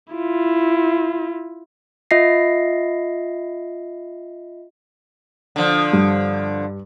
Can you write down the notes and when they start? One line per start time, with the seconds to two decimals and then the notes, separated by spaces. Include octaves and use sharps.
0.14 E4 F4
2.11 F4 D#5 E5 A#6 C7
5.56 D3 F3
5.93 G2